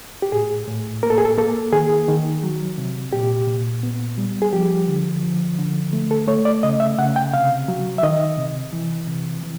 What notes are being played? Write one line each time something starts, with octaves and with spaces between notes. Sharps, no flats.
G4
A2 G#4
A2
A#3 A#4
A4
G#4
A4
A#3 A4
D#3 G#4
D#3
F#3
C3
A#2 G4
A#2
B3
G3
G#4
F3 G4
D3
F3
D3
A3
A4
A3 C#5
D5
C#3 D#5
E5
C#3 F#5
G5
C3 F5
F#3
E5
D#3 D#5
C3
E3
C3
E3